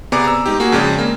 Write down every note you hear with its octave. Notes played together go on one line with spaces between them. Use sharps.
C3 B3 G#4 D5 A#5 D6
A#5 E6
G#3 D#4 G4
A#3 F#4 G#4
F2 C#3 G#3 C#4 D5
A#3